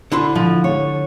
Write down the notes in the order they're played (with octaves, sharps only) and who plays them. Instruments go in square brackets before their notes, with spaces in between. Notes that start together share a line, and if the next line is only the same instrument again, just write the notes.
[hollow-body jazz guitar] D3 E4 C6
[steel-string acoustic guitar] F3
C#5